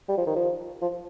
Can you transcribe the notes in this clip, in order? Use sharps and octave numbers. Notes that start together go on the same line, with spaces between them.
G3
F3
D#3
F3
F3